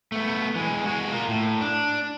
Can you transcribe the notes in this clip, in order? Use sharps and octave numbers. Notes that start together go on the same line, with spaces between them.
A3 B3
E3 G#3
G#3 F#4
F4 A#4
A2
D4